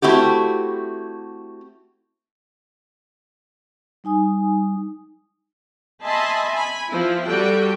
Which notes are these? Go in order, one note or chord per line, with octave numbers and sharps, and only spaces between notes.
A3 C4 E4 F#4 G4
G3 D#4 G#5 D#6
D#5 E5 G#5 A5 B5 C6
G#5 B5
F3 E4
G3 F#4 A4 G5